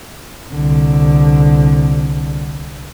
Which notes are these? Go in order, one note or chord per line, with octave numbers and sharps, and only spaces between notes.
C2 D3